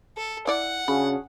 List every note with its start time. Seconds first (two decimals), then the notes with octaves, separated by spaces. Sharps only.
0.17 A4
0.47 E4 D5 F#5
0.88 C#3 D4 F#4 G#4 B5